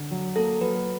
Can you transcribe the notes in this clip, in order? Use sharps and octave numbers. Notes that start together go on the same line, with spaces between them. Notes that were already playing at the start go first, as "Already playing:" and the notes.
Already playing: D3
F#3
A#3 A4
F#3 B4